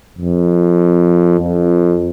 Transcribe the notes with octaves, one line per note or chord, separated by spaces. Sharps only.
F2
F2